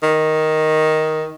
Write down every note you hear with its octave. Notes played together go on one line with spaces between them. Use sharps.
D#3